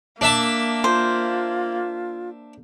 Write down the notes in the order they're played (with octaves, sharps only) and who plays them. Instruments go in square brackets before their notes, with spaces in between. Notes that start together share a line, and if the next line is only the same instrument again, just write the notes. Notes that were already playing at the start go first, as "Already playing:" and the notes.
[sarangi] A#3 [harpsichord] D4 E5 A5
[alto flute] F4 [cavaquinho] C5